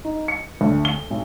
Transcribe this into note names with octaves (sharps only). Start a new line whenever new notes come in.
D#4
C#7
D2
G7
B1